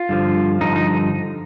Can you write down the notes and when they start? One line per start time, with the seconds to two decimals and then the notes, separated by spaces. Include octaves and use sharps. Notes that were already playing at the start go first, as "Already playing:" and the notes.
Already playing: F4
0.09 G2 D3 F3
0.61 G2 D3 F3 D#4
0.76 D#4